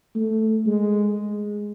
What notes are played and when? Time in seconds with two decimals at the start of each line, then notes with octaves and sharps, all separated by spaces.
0.16 A3
0.66 G#3